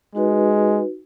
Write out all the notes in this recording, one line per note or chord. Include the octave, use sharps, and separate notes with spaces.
G#3 D#4 F#4 B4